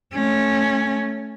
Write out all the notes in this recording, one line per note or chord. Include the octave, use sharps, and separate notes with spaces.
A3 C#4